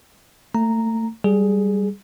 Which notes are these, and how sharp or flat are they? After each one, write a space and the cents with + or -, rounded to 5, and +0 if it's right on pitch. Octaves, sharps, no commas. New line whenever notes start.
A3 +30 A#5 -5
G3 +0 G#4 +10